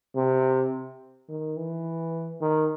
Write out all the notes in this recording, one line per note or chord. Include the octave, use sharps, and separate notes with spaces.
C3
D#3
E3
D#3